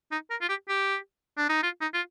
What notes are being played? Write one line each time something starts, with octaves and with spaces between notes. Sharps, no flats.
D#4
A#4
F4
G4
G4
D4
D#4
F4
D#4
F4